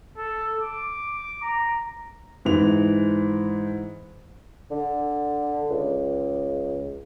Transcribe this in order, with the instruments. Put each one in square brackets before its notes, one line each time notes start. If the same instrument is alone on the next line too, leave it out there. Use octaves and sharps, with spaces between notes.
[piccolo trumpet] A4
D6
A#5
[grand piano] G#2 E3 F7
[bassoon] D3
C#2